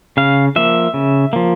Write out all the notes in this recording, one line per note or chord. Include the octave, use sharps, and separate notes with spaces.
C#3 F5
F3 A#3 E5
C#3
F3 A#3